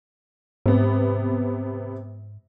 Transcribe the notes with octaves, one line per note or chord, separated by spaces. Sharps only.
G#2 C3 B3